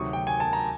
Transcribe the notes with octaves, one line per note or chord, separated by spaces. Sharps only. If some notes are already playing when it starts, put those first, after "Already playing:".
Already playing: D2 C3 D#3 F#3 C#6 D#6
G5
G#5
A5
A#5